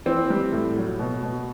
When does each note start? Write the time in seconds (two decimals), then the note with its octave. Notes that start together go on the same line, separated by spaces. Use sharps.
0.06 E3 C4
0.30 G3
0.52 A2
0.77 F#3
0.99 B2
1.23 B2